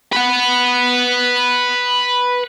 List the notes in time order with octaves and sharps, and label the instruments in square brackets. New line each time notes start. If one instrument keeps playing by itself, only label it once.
[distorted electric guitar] B4 F#5